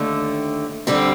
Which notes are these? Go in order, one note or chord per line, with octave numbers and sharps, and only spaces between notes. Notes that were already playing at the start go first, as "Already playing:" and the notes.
Already playing: D#2 D3 A3
D3 G3 C4 G4